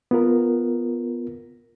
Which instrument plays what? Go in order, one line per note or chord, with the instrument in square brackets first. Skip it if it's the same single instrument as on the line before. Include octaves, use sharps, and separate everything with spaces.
[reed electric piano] B3 F4 A#4